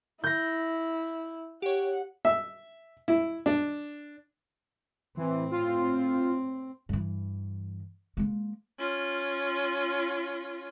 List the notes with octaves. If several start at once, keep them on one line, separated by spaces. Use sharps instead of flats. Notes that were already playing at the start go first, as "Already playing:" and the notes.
E4 G6 A#6
G4 C#5 F#5
E5
E4
D4
A2 E3 C4
F4
G2 E3
G#3 A#3
C#4 F4